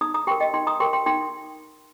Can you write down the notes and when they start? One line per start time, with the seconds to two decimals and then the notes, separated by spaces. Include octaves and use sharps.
0.01 D#4 A#5 D#6
0.14 A#5 D#6
0.27 G4 A#4 G5 C6
0.40 D#5 G5
0.54 D#4 G5 C6
0.67 A#5 D#6
0.80 G4 A#4 G5 C6
0.93 G5 C6
1.06 D#4 G5 C6